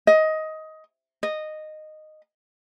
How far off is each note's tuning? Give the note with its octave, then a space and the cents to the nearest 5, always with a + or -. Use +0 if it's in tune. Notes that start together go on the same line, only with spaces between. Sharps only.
D#5 +15
D#5 -10